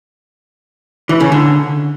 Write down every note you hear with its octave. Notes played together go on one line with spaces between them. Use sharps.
E3
C#3
D3